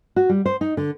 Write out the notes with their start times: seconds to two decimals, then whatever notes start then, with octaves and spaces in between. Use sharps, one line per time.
0.16 F#4
0.29 G3
0.46 C5
0.61 D#4
0.77 D3